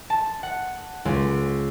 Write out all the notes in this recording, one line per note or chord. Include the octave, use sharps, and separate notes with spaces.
A5
F#5
C#2